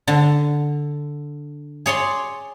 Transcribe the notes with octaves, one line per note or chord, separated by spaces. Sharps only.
D3
G#4 C#5 D5 C6